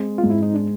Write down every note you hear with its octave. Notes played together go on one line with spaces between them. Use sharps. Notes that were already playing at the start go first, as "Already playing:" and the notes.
Already playing: G#3 C4
F4
G#2
E4
D#4
D4